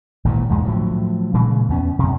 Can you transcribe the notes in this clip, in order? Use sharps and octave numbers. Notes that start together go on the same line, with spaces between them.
G#1 A#2 D3 E3
B1 E2 G#2 G#3
A2 D3 F3 F#3
A#2 C#3 E3 G#3
E2 B3 C#4
F#2 C3